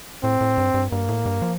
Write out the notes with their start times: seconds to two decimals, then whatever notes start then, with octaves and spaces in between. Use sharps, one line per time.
0.24 A2 C4
0.41 A2
0.58 G2
0.74 G2
0.92 G2 A#3
1.09 A2
1.26 G2
1.42 F3